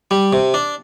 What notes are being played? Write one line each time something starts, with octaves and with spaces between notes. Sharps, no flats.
G3
C3
D4